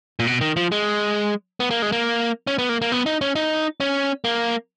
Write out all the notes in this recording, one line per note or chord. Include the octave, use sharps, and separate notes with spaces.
A#2
B2
D#3
F3
G#3
B3
A#3
G#3
A#3
C#4
B3
A#3
A#3
B3
D#4
C#4
D#4
C#4
A#3